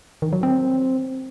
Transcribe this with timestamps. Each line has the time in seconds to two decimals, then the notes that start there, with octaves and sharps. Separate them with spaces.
0.22 D#3
0.33 F#3
0.43 C4